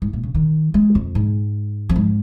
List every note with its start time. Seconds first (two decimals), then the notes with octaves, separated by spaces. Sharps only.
0.02 G#2
0.13 A#2
0.23 C#3
0.34 D#3
0.74 G#3
0.95 F2
1.15 G#2
1.89 F2
1.96 G#2